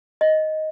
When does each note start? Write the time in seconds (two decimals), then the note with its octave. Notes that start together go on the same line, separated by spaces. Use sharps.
0.21 D#5